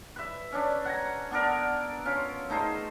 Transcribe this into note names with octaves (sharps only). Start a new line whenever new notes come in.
B4 E5
C#4 D4
F#5 G#5 A#5
B3 D4 A4 A#4
C#4 F4
A3 D#4 G#4 C5